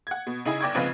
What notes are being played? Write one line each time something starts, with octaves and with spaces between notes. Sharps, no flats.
F#5 G#6
B2
C#3 D#4 E4 G#4
G1 D5 G5 C#6 G#6
G#2 C#3 F3 C4 F4 B4